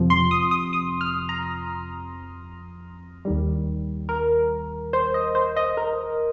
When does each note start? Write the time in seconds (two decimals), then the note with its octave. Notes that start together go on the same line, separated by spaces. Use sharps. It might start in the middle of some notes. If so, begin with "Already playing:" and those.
Already playing: F2 C3 F3
0.10 C6
0.31 D#6
0.51 D#6
0.73 D#6
1.01 F6
1.29 A#5
3.25 D#2 D#3 G3
4.09 A#4
4.93 C5
5.14 D#5
5.35 C5
5.57 D#5
5.77 A#4